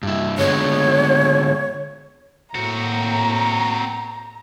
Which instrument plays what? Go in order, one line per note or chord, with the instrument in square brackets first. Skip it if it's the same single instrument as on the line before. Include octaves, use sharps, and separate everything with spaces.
[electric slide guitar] G2 E4
[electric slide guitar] D3 G#3 B3 [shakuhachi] C#5
[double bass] A2 A#3 [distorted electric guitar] C4 F#4 [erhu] A#5